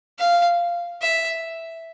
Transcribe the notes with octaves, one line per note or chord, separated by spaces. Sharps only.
F5
E5